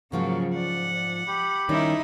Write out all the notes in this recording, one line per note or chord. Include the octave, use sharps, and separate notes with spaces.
G#2 C#3 F3 F#3 A#3 F4 F#4
D5 F#5
D5
G4 B5
D#3 G3 C#4 D#4 E4